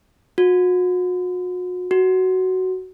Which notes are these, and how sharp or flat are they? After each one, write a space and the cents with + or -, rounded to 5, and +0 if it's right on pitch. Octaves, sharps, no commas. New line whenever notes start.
F#4 -40
F#4 +10